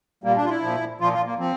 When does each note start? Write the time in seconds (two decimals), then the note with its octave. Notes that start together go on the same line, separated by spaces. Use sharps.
0.24 A#2 G3 A#3
0.36 D4
0.45 F4
0.49 E4
0.62 A#2 F3
1.00 A#2 F3 F4
1.13 F4
1.25 A#3
1.39 F3 C4